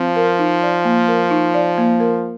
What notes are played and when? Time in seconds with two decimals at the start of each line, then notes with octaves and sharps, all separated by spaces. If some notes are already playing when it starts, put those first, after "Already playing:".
Already playing: F3 C4
0.16 A#4
0.39 D#4
0.63 D5
0.85 A#3
1.08 A#4
1.31 D#4
1.54 D5
1.78 A#3
2.00 A#4